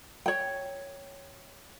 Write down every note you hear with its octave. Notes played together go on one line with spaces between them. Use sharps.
C#5 G5